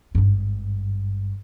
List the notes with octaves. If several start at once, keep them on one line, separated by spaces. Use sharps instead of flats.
G#1 G2